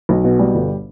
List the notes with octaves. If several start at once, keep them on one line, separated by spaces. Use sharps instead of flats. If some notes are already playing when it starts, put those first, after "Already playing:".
B1
B2
G3
G1